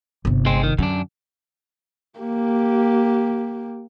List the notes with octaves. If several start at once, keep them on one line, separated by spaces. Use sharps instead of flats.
G1 C3
G#3 C4
D#3
F#2 D3 D4
A#3 G4